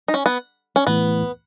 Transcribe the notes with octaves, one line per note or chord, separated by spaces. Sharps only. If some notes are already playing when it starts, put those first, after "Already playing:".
D#4
C#4
B3
C#4
A2 E3 A3 B3 E4